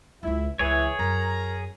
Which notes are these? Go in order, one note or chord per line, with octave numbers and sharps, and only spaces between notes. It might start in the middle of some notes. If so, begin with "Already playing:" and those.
C#2 E4 F4
C#2 E3 G#4 C#5
F#2 A#4 A#5